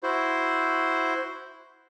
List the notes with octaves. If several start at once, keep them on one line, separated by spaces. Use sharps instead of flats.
E4 F#4 C5